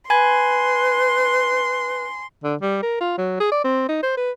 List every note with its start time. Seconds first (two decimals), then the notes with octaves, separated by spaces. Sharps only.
0.10 B4 G#5 B5 C6 G#6
2.43 D3
2.61 G3
2.83 A#4
3.01 F4
3.18 F#3
3.40 G#4
3.52 D5
3.64 C4
3.89 D#4
4.03 C5
4.17 B4